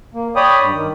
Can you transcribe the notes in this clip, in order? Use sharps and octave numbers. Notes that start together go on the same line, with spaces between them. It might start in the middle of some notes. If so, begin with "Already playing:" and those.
A#3
C#5 D5 G5 B5 D#6
G2
D#3